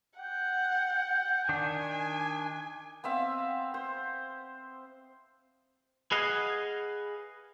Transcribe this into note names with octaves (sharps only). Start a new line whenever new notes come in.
F#5 G5
D#3 D4 G#5
B3 C4 E5 F5
C5
G#4 B4 D#5 F5 F#5 G#5